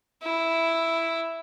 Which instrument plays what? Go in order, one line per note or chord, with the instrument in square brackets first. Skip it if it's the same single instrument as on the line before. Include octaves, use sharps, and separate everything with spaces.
[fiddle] E4